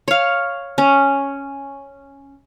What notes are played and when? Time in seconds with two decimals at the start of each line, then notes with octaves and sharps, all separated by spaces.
0.08 C#5 F5
0.78 C#4